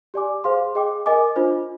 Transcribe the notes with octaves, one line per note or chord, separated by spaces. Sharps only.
G4 D5 G#5 D6
G#4 C5 F5 C6
G#4 D#5 G5 D6
A#4 D#5 G#5 D6
D4 F4 C5